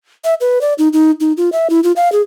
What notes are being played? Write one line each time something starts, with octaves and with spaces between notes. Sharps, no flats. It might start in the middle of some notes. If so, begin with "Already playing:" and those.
E5
B4
D5
D#4
D#4
D#4
F4
E5
E4
F4
F5
G#4